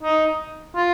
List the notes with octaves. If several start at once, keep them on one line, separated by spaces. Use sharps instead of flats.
D#4
F4